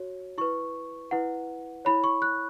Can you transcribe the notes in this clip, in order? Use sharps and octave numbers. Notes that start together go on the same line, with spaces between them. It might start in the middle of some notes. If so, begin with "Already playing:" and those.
Already playing: F#4 C#5
E4 B4 C#6
E4 B4 F#5
E4 C#5 B5
C#6
F#6